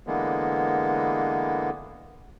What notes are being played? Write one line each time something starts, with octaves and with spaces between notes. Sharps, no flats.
D3 E3 G#3 A#3 B3